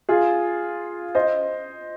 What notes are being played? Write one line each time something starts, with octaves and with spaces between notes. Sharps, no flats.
F4 G#4
C5 D#5